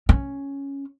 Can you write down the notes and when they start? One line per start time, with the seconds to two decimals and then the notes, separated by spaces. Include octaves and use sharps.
0.09 C#4